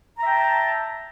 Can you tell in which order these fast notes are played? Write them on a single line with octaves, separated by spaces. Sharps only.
A#5 E5 G5 A5